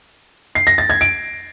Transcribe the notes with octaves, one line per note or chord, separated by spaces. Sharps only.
C7
A#6
A6
G#6
D7